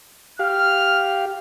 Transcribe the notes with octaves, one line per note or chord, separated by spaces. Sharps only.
G4 F5 F6